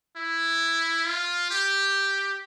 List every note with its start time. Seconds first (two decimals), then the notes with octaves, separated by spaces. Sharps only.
0.16 E4
1.05 F4
1.50 G4